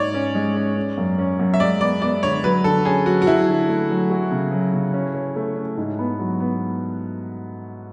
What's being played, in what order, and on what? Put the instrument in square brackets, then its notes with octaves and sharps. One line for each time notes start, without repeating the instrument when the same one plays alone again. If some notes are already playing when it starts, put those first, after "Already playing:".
Already playing: [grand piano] G#2 [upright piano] C#5 D5
[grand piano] C#4
G#3
C#4
C#4
F#2
C#4
F#2
[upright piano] E5
[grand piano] G#3 [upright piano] D5
[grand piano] B3 [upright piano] D5
[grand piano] B3 [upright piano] D5
[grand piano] D3 [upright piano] C#5
[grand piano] F#3 [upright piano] B4
[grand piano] D3 [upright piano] A4
[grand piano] C#4 [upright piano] G#4
[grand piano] F#3 [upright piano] F#4
[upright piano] F#4
[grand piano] F#3 [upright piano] E4
[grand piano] D3
A3
F#3
F#4
C#3
F#3
C#3
C#4
C#4
A3
C#4
G#2
B3
F#3
B3